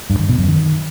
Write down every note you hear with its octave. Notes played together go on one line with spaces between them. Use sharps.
G2
D#3
B2
F#2
D#3